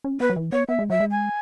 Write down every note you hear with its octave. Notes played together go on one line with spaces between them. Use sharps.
C#4
B3 B4
F#3
E3
B3 C#5
B3 E5
G#3
F#3 E5
G#3
G#5